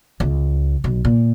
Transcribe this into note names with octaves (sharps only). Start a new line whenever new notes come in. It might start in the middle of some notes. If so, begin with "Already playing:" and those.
C#2
B1
A#2